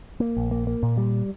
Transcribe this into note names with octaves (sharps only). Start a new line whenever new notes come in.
A#3
A#1
A#3
A#3
A#2
G3